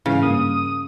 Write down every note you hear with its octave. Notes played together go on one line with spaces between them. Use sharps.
G#2 C#3 E3 F5
G2 A#3 D#6